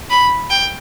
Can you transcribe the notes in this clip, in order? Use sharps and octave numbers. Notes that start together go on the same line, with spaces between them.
B5
G5